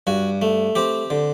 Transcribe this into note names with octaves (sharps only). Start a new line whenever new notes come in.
G2 F#4
A3
C4 G4
D3